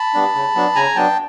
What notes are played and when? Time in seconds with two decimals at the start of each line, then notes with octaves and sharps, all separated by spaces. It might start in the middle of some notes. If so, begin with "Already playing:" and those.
Already playing: A5 B5
0.14 G3 B3 D4
0.35 C#3
0.55 F#3 B3 D4
0.75 C#3 G#5 A#5
0.96 F#3 B3 D4 G5 A5